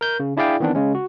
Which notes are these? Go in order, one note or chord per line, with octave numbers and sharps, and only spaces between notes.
A#4 G6
C#3
D4 E4 G#4 D5 F5 G5
D#3 E3 B3 C4 D4
C#3 G#3 C#4
F#4